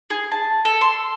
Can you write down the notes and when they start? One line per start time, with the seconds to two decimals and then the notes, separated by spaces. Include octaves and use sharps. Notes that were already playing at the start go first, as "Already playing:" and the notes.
0.10 G#4
0.31 A5
0.65 A4
0.81 C6